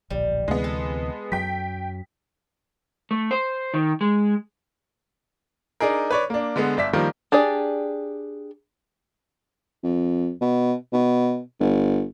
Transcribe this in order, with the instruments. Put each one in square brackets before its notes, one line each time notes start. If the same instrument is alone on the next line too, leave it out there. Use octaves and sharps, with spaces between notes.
[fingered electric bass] D1 A#1 [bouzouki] G3
[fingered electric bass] D2 C3 E3 [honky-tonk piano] G#3 B3
[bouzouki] A4
[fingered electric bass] F#2 F#3 [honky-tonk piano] G5 B6
[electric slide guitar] A3
C5
D#3
G#3
[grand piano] D4 D#4 G#4 A#4
B4 C#5 D5
A#3 D4
D3 G#3 B3
G1 D5 E5 B6
D#3 F3 G3 A#3
[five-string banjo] D4 G4 G#4 D5
[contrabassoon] F2
B2
B2
G1